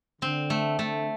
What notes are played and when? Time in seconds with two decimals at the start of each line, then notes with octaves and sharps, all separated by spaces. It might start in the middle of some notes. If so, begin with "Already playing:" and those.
0.22 D3 C4
0.50 A3
0.79 D3 A3